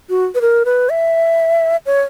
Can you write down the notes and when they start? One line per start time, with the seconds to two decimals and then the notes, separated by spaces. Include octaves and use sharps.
0.09 F#4
0.35 B4
0.41 A#4
0.65 B4
0.90 E5
1.86 C#5